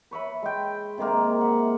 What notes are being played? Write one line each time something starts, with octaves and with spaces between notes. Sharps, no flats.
B4 C#5 E5 B5
G#3 G5
C3 D#3 G#3 A#3
E5 F#5